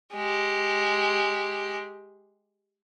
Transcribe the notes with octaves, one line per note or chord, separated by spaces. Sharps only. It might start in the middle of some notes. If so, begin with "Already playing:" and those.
G#3 G4